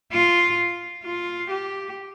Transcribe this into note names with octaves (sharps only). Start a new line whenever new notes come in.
F4
F4
G4